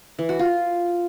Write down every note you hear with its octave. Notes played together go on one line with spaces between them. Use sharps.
E3
F#4
F4